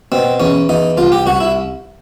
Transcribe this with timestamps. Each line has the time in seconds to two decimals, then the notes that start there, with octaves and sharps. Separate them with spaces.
0.12 B2 C4
0.40 E2 C#4
0.69 E2 D#4
0.97 C2 F4
1.12 G4
1.26 C2 F#4
1.40 E4